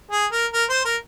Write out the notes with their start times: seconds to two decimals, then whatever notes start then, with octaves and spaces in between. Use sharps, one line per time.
0.11 G#4
0.32 A#4
0.53 A#4
0.70 C5
0.85 A#4